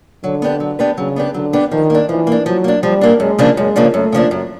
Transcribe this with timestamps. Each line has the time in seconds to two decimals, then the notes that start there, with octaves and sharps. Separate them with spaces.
0.24 D3 F#3
0.42 B3 D4 G4 B4
0.60 F#3
0.79 B3 D4 G4 B4
0.98 C#3 F#3
1.16 B3 D4 G4 B4
1.34 D3 F#3
1.53 B3 D4 G4 B4
1.72 D#3 F3
1.90 A#3 D4
2.09 E3 F3
2.27 A#3 D4
2.45 F3 F#3
2.64 A#3 D4
2.83 F3 G3
3.01 A#3 D4
3.20 F#2 G#3
3.39 C#3 F3 A#3 D4
3.57 F#2 G#3
3.76 C#3 F3 A#3 D4
3.94 F#2 A3
4.12 C#3 F3 A#3 D4
4.31 F#2